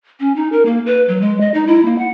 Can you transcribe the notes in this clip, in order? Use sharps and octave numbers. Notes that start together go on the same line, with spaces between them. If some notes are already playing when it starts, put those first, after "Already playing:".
C#4
D#4
A#4
A#3
B4
F#3
G#3
D#5
D#4
E4
A#3
F#5